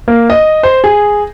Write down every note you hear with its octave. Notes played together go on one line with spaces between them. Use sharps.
A#3
D#5
C5
G#4